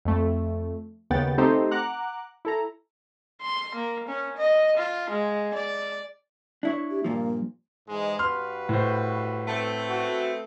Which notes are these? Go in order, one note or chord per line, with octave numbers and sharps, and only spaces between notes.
F2 A3
D#2 C#3 B3 F#5 G5 A6
A3 C4 D#4 G4 A4 C5
F#5 A#5 D6 F#6
E4 A4 A#5
C6
A#3
C#4
D#5
F4
G#3
D5
D4 E4 C#5
G4
G2 A#2 F3 A#3
G#2 E3 G#3
G2 F#4 B4 C6 F6
A2 C5
A3 B3 C4
F#4